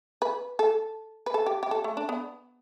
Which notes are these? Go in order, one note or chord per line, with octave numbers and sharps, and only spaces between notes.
B4
A4
B4
A4
G4
G4
A4
A3
D4
B3